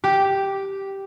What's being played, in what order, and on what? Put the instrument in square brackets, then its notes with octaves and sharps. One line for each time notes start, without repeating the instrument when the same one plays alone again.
[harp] G4